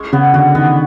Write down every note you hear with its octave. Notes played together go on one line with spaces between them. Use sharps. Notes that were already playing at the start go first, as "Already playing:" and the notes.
Already playing: G#3 C#4
C#3 B3
D3 F#4
D#3 B3